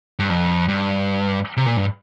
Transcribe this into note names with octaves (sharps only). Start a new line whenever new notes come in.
G2
F2
G2
C3
A#2
G2